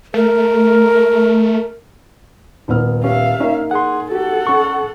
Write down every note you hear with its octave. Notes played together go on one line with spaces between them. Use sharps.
A3 A#4
D#1 B3 F6
C#4 G4 E5 F5
A#3 C#4 D#4
G#4 F#5 C6
F#4 G4 A4 F#5
C#4 C#6